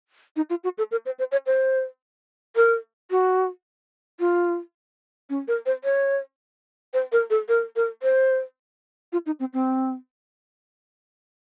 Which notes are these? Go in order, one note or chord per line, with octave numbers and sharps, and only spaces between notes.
D#4
F4
F#4
A4
A#4
C5
C5
C#5
C5
A#4
F#4
F4
C#4
A#4
C5
C#5
C5
A#4
A4
A#4
A#4
C5
F4
D#4
C4
C4